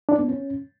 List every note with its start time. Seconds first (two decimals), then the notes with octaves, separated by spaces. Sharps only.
0.09 D4
0.19 B3
0.28 C#4